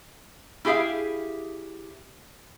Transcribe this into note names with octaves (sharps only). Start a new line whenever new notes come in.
E4 G4 G#4 E5 F5